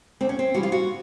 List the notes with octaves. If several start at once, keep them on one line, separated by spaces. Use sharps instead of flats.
D2 C4
C#4
C4
C#3 E3 G3 F#4
F4
F#4